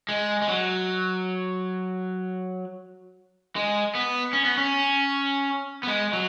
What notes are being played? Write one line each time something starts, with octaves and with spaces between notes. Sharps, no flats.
G#3
G#3
F#3
G#3
B3
C#4
B3
C#4
B3
G#3
F#3